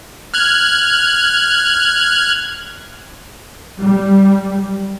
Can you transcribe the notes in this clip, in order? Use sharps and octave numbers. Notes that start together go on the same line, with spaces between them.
F6 F#6 G#6
G3